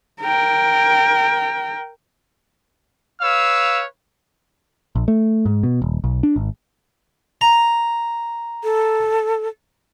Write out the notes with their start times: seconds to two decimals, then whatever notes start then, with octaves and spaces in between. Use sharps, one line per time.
0.21 A#4 G5
3.22 B4 C#5 F5 E6
4.96 A#1
5.08 A3
5.46 G#2
5.63 B2
5.82 D#1
6.04 B1
6.23 D4
6.36 G#1
7.41 A#5
8.64 A4